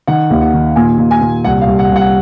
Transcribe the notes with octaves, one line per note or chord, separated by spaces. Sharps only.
D#3 F#5
D#2
F#5
D#3
A#2 G#5
A#2
G#5
A#2
C2 F#5
F5
C2
F#5
C2
F#5